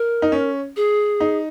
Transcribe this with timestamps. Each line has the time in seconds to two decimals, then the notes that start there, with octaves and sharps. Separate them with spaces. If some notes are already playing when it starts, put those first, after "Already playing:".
Already playing: A#4
0.22 D#4
0.32 C#4
0.77 G#4
1.20 D#4